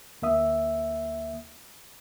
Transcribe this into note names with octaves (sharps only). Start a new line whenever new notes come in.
D2 A#3 E5 D#6